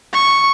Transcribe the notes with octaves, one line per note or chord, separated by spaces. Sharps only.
C#6